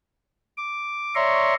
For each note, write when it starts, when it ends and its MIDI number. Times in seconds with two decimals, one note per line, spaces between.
0.57 1.14 86
1.15 1.54 73
1.15 1.54 74
1.15 1.54 76
1.15 1.54 82
1.15 1.54 84
1.15 1.54 85